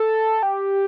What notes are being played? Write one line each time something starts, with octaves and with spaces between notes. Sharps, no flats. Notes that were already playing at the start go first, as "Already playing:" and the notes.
Already playing: A4
G4